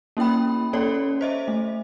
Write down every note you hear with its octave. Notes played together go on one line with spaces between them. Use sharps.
A#3 C#4 E4 G5 B5
A#3 C#4 A4 C#5 D5
C5 D#5 E5
A3